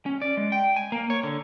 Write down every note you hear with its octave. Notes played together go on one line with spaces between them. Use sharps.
C#4
D5
G#3
G5
G#5
A#3
C#5
D3